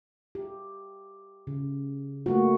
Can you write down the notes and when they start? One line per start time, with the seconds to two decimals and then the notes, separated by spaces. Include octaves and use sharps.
0.35 G4
1.47 C#3
2.26 A3 A#3 F#4